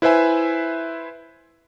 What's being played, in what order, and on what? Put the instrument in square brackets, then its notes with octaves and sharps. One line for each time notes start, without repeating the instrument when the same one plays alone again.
[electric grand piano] E4 B4 C5 E5 G#5